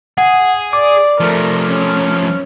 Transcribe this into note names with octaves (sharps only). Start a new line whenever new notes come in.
G#4 F#5
D5 D6
F3 A3 A#4
C#4